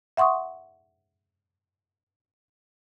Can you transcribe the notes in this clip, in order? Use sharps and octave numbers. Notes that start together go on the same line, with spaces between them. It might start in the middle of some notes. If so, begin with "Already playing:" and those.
E5 F#5 C6 C#6 D#6